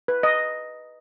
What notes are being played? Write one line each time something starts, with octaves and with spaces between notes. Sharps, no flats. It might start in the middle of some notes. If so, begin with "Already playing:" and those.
B4
D#5